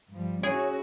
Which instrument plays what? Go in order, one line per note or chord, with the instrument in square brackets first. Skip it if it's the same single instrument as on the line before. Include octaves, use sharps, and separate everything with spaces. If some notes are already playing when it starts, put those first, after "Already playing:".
[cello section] G2 F3 G3
[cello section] C#4 E4 F#4 [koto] G#4 [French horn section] C#5